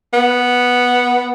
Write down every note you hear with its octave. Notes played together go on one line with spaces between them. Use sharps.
B3